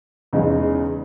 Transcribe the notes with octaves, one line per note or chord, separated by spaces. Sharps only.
E2 C#3 G#3 D#4